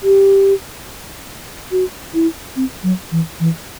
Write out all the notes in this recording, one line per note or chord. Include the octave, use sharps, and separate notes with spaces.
G4
F#4
E4
C4
F#3
E3
E3